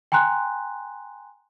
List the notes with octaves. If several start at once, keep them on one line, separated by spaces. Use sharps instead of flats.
G5 G#5 A#5 C6 F#6